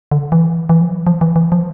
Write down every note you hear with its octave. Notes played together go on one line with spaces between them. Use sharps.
D3
E3
E3
F3
F#3
F3
E3
E3
F3